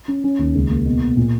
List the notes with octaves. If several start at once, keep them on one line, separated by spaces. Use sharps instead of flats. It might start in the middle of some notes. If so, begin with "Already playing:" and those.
C#4
C#4
D#2
C#2
A#3
B2
B2
A#2